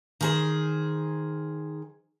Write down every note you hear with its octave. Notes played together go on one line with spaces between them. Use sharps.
D#3 G#4 C5